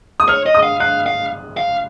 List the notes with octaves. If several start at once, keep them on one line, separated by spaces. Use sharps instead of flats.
D#6
C#5 F6
D#5
D#6
F5
F5 F#6
F5
F5